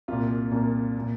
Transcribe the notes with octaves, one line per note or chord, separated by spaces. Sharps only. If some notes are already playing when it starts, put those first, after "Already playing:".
C2 A#2 F4
C2 A#2
A#2